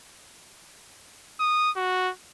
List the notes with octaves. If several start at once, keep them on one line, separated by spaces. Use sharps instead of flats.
D#6
F#4